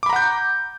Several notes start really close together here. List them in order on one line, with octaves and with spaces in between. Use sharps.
D6 B5 A#5 F#5 G6